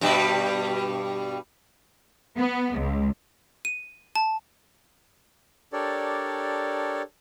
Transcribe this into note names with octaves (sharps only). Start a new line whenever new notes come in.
G2 B2 G3
B3
C#2
D#7
A5
D4 G4 A4 A#4 C#5 D5